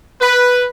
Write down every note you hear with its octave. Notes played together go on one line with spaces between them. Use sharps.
B4